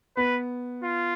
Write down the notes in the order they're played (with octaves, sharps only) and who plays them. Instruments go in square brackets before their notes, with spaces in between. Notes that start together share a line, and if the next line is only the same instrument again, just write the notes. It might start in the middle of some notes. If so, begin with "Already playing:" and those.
[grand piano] B3 [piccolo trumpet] B4
[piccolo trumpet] F4